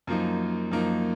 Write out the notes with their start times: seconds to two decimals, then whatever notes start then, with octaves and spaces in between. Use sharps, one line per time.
0.07 F#2 F3 A#3 D#4
0.71 F#2 F3 A#3 D#4